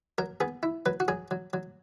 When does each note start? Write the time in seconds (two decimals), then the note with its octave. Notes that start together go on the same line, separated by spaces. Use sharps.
0.18 F#3 A#4
0.40 B3 G#4
0.63 E4
0.86 F#3 B4
1.00 F#4
1.08 F#3 G#4
1.31 F#3
1.53 F#3